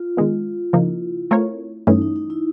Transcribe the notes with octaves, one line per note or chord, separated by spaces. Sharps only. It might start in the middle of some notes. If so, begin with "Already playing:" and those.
Already playing: F4
D#3 G#3 B3
C#3 F3 A#3 D#4 E4
A3 C4 F4 A#4 C#5
G2 E3 A3 C#4 D#4
D#4
D#4
E4